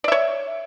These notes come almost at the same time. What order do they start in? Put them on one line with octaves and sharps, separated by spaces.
D5 E5 C#5